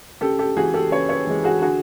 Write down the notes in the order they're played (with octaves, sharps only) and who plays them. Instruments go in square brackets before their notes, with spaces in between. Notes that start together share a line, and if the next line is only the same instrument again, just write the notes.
[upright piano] C#3 G4 A4
G4 A4
E3 G#3 F#4 G#4
G4 A4
C#3 B4 C#5
B4 C#5
E3 G#3
F#4 G#4
D3 F#4 G#4